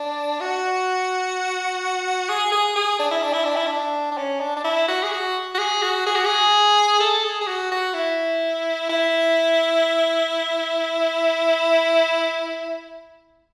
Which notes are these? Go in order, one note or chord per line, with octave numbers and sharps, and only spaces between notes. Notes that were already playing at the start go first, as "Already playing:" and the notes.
Already playing: D4
F#4
G#4
G#4
G#4
D4
E4
D4
E4
D4
E4
D4
D4
C#4
D4
D4
E4
F#4
G#4
F#4
F#4
G#4
F#4
G#4
F#4
G#4
A4
G#4
G#4
F#4
F#4
E4
E4